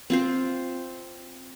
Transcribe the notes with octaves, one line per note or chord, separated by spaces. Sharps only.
C4 F4 C5